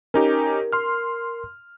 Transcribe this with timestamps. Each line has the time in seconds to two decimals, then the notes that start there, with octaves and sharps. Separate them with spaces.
0.14 C#4 D#4 G4 A#4
0.73 C6 F6